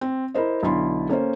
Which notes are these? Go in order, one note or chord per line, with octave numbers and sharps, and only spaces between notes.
C4
E4 A#4 C5 D#5
B1 D3 E4 C6
A#3 C#4 A4 C5